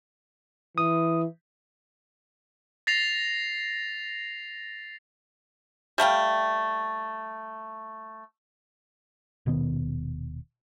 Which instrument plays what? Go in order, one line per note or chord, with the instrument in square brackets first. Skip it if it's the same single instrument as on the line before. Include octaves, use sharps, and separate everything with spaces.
[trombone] E3 [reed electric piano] D#6
[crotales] A6 A#6 C7 F7
[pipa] G3 A3 F5 G5
[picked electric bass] D#1 B2 D#3 B3